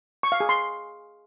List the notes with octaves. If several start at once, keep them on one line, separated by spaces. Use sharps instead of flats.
C#6
F5
G#4
C6